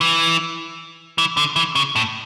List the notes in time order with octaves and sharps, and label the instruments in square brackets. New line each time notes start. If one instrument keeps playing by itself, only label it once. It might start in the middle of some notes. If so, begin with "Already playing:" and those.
[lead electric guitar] E3
E3
D3
E3
C#3
A2